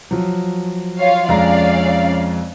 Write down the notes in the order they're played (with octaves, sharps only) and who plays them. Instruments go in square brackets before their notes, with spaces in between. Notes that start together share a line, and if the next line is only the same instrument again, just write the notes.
[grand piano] F3 F#3
[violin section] F4 C#5 F5
[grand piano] F2 G#3 A#5 [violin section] C#4 D5 F5